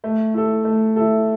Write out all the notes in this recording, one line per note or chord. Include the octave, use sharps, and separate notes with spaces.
A3
E4 A4
A3
E4 A4